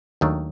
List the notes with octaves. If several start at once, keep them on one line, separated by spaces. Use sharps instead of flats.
D#2 D#3 F#3 A3 D4